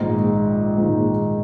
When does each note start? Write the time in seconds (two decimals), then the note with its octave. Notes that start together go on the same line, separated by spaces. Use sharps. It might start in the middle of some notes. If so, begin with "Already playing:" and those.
Already playing: A#1 G#2 D#3
0.77 A#1 G#2 D#3